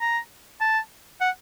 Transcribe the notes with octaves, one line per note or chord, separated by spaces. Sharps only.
A#5
A5
F#5